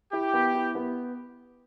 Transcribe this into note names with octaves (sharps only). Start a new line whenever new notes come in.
E4 G4
B3
E4
B3